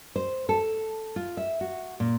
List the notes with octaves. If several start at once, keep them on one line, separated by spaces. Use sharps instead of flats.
C5
A4
F4
E5
F#4
A#2